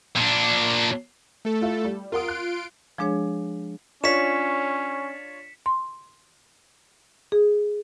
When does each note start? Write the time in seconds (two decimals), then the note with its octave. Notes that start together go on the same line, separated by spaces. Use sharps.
0.16 A#2 D4
1.45 A3 A4
1.61 E4 F4 E5
1.85 G3
2.12 F4 A#4 F#5 C6 D#6 D7
2.28 F#6
2.98 F3 G#3 D4 G#4 C#5
4.04 C#4 D4 F4 C#5 B6 C#7 E7
5.66 C6
7.32 G#4